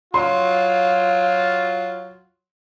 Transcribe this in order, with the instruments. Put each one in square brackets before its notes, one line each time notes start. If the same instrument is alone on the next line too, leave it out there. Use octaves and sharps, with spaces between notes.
[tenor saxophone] F#3 [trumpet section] F4 [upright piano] C6